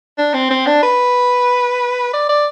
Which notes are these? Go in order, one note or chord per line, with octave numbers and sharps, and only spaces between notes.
D4
C4
C4
D4
B4
D5
D5